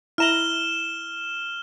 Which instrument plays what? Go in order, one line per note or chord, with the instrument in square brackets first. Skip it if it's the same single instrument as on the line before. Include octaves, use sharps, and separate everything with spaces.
[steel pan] E4 A#5 [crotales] F6 E7 G7